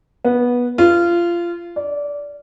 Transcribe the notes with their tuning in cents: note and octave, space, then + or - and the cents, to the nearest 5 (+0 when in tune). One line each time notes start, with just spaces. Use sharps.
B3 -15
F4 -20
D5 -20